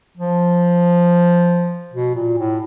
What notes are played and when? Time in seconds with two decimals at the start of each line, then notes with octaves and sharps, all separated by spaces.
0.17 F3
1.94 B2
2.15 A#2
2.38 A2